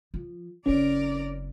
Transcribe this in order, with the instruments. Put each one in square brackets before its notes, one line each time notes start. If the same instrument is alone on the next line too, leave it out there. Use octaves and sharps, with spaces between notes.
[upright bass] F3
[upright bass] F#1 C4 [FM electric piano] C#4 [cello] A#4 D5